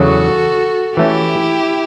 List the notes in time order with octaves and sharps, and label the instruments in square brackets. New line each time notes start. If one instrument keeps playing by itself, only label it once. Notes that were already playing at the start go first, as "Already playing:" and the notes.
Already playing: [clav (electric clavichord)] E2 C#3 F#3 [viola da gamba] F#4 A4
[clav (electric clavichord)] E3 A3 C#4 [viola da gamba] E4 G4